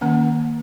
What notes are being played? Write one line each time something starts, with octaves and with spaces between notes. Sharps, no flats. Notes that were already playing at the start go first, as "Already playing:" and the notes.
D#3 A#3 C#4 F#5